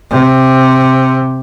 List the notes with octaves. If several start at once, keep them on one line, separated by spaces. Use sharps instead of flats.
C3